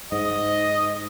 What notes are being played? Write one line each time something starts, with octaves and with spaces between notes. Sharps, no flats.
G#2 D#5